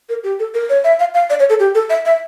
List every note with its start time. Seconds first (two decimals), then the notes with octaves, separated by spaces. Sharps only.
0.09 A#4
0.24 G4
0.39 A4
0.54 A#4
0.70 C#5
0.84 E5
1.00 F5
1.14 F5
1.30 D5
1.40 C#5
1.50 A4
1.60 G4
1.75 A4
1.90 E5
2.05 E5